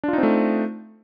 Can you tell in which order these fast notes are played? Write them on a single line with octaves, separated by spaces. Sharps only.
D4 F4 D#4 C4 A3